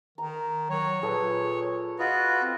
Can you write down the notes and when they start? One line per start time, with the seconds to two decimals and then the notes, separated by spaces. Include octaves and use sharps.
0.18 D#3 A#5
0.70 F#3 C#5
1.02 A#2 G#4 A4 B4
1.99 F4 F#4 B4 D#5
2.42 C4